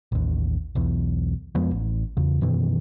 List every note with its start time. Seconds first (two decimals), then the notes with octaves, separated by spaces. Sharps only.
0.12 A1 D#2
0.75 B1 E2
1.55 F2 F3 G#3 B3
1.71 A1
2.17 E2 C#3
2.41 F#2 B2 D#3 E3